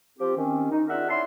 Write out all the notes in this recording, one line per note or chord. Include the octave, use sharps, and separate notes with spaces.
F3 C4 F4 G4
D#3 C4 C#4
D#4
D4 F4 G#4 A#4 E5 F#5
E4 C#5 D5 A5 C6